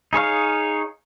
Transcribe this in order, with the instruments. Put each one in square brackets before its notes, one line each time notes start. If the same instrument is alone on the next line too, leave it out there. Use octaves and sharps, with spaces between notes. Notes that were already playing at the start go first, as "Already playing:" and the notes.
[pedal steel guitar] D#4 G#4 C#5 F5